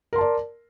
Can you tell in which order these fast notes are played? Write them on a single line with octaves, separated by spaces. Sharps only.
A#4 C6 A5 D5